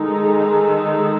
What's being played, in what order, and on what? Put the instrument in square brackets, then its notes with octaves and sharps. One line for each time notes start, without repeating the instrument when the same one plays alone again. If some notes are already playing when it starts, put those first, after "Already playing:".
Already playing: [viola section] D#3 G#3 D#4 A4
[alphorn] G#4